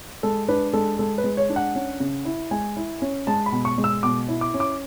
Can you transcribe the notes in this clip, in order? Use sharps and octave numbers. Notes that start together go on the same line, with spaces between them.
G#3 A4
D4 B4
G#3 A4
G#3 A4
B4
G#3
C#5
D4
F#5
C#4
C#3
E4
G#3 G#5
E4
C#4
G#3 A5
B5
B2
C#6
G#3
E6
B2 D6
E4
D6
C#4
D6